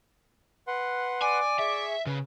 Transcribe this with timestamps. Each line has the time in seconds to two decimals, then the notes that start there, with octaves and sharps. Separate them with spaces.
0.67 B4 F#5 C6
1.22 D5 G#5
1.59 G#4 E5 C#6
2.06 C#3 B4